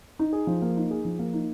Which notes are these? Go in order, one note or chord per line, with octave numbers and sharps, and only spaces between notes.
D#4
G#4
F3
A#3
D#4
G#4
F3
A#3
D#4